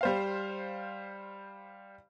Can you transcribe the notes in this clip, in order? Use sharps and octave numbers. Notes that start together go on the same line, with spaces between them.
G3 C5 F5